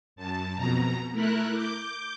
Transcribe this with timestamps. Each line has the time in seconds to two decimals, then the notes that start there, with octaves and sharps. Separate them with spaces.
0.16 F#2 A5
0.55 F2 B2 A#5
1.12 A3 E4 A#4 F#6
1.52 D6 G6